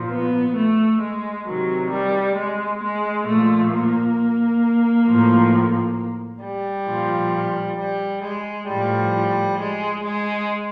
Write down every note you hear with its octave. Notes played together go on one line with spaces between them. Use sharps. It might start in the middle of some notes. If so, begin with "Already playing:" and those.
Already playing: A#2 F3
B3
A3
G#3
C3 D#3 F#3
G3
G#3
G#3
A#2 F3 A3
A#3
A2 F3
G3
A#2 F3
G3
G#3
A2 F3 G3
G#3
G#3